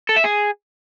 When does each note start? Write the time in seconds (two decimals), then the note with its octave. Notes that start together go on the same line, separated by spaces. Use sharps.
0.09 A4
0.16 E5
0.24 G#4